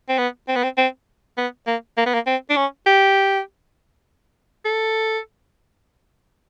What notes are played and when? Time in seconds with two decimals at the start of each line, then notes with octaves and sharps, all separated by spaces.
0.09 C4
0.18 B3
0.48 C4
0.56 B3
0.63 C4
0.78 C4
1.38 B3
1.67 A#3
1.97 A#3
2.06 B3
2.14 A#3
2.27 C4
2.50 D4
2.57 C#4
2.86 G4
4.65 A4